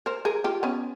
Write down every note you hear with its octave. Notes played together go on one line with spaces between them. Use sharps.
A#4 C5
G#4 A#4
F4 G4
B3 C#4